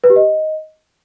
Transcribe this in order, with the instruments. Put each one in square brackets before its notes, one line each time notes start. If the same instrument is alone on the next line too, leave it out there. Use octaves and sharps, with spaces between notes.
[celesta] B4
G4
D#5